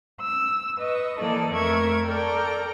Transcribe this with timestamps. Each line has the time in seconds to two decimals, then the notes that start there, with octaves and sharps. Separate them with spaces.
0.21 E6
0.78 B4 D#5 C#6
1.19 E3 F3 A#3 A4 D5 D#5
1.52 F2 A3 A#4 E5 C#6 G#6
2.06 A4 A#4 D5 G5 A#5 F6